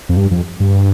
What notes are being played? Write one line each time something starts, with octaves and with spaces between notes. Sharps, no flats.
F2
G2
F2
G2